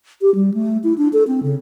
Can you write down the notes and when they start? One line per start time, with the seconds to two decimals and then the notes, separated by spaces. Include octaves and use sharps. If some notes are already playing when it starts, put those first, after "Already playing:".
0.22 G4
0.35 G3
0.54 A3
0.84 E4
0.98 D4
1.13 A4
1.27 C4
1.43 C#3